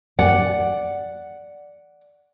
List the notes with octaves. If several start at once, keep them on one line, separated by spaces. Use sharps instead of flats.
D5 F#5